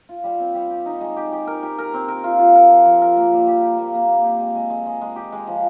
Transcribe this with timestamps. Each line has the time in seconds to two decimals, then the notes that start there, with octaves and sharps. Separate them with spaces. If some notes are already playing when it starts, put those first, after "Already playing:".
0.09 F4
0.24 G3
0.40 C4
0.54 G3
0.70 G4
0.86 D#4
1.01 G#3
1.16 G4
1.32 G4
1.47 A#4
1.63 G4
1.78 A#4
1.94 C4
2.08 A#4
2.24 F4
2.39 F4
2.55 A#4
2.70 F3
2.86 F3
3.02 A#4
3.17 A#3
3.32 G3
3.47 G4
3.62 G4
3.78 A#3
3.94 A#3
4.08 A#3
4.24 G4
4.40 G#3
4.55 G#3
4.70 G#3
4.86 G#3
5.01 G#3
5.16 G4
5.32 G#3
5.47 F3